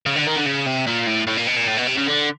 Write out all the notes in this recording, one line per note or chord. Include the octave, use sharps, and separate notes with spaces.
C#3
D3
D#3
D3
C#3
C3
A#2
A2
A2
A#2
B2
A#2
A2
B2
C3
C#3
D3